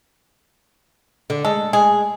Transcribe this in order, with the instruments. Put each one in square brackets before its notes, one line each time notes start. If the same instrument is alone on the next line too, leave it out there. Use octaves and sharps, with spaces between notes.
[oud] D3
[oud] G#3 [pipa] A4
[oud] G#3 [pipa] G#4